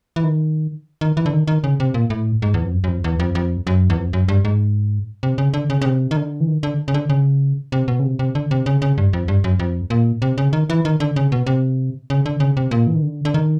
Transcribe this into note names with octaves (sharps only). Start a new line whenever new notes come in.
E3
D#3
D#3
E3
D3
D#3
D#3
C#3
C3
A#2
A2
G#2
E2
F2
F#2
F#2
F2
E2
F2
F2
F#2
E2
F2
F#2
G2
G#2
C3
C#3
D3
C#3
C#3
C3
D#3
D3
E3
D#3
D3
C#3
D3
C#3
C3
B2
C#3
C3
C3
D3
C3
C#3
C#3
G2
F2
G2
F#2
F2
A#2
C3
C#3
D#3
E3
D#3
D3
C#3
B2
C3
C#3
D3
C#3
C3
A#2
E3
D#3
D3
D3
D#3